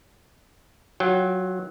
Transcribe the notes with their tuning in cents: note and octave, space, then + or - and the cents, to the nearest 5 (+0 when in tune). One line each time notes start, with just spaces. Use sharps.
F#3 +0 F4 +25 G5 +0